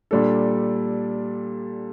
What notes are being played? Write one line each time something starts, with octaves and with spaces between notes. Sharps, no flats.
A#2 G3 D4 A4